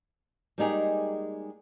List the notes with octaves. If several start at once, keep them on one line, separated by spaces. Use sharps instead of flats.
G3 G#3 A#3 D#4 G4 G#4